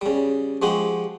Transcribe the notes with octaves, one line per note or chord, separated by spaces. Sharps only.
C#3 G3
F3 G#3 F#4 G4